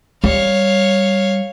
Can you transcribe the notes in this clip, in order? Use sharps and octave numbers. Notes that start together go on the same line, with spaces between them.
G3 C#5 F5